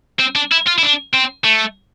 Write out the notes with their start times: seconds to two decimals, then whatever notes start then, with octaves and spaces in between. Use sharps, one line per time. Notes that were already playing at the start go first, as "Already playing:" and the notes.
0.19 C4
0.36 D4
0.52 E4
0.67 F4
0.78 E4
0.83 D4
1.14 C4
1.45 A3